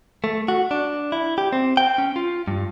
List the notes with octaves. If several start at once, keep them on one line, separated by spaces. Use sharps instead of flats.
A3
F#4
D4
E4
G4
C4
G5
C#4
F4
G2